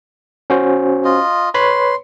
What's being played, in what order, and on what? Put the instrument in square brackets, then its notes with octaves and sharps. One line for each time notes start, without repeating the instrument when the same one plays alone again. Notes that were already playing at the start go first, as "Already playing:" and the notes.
[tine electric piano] C#4 F#4 C5
[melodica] F4 D#5
[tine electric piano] B4 C#5 B5 [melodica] C6